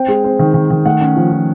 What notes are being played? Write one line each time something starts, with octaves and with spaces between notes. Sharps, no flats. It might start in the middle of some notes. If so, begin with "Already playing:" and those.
Already playing: C4 G5
G#3
C4
D#3
D#3
D#3
A3 F#5
C#4
F3
F3